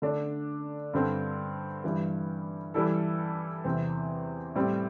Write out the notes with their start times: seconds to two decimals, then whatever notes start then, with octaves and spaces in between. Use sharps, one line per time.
0.02 D3 A3 D4
0.93 G2 D3 C4 A4
1.84 G2 E3 G3
2.74 E3 G3 E4 A4
3.64 E2 C3 E3 C4
4.55 A2 G3 C4 G4